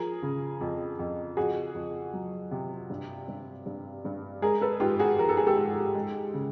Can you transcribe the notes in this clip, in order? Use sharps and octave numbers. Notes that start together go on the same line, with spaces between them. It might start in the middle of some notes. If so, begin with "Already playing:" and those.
Already playing: F3 G#4 A#4
C#3
F2
F2
F2 F#4 G#4
F2
F#3
C3
G2
G2
G2
G2
G#3 G#4 A#4
A4 B4
G#2 F4 G4
F#4 G#4
F3 A#4
A4
G#4
G4 A4
G#2
G#3
C#3